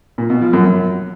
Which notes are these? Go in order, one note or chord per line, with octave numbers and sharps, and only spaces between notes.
A#2
B2
F3
F#2
F#2